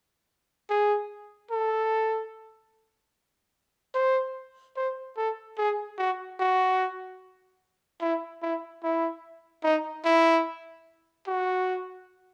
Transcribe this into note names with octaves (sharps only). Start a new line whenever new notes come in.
G#4
A4
C5
C5
A4
G#4
F#4
F#4
E4
E4
E4
D#4
E4
F#4